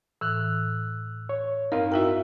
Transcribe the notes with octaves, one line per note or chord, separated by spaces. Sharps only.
A2 E3 E6 F#6
C#5
G2 C4 D#4 A#4 F5
E4 F#4 A#4 E5 G5